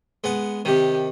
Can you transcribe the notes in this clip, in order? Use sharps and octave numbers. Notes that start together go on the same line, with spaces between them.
G#3 B3 F#5
C3 D#3 G4